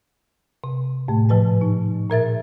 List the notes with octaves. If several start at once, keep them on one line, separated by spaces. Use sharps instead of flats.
C3
A2 A3
G#2 F3 B4 A5
D#4
A#2 A#4 E5 A6